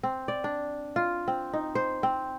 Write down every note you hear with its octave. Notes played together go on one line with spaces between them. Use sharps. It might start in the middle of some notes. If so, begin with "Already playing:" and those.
C4
D5
D4
F4
C4
D#4
C5
C4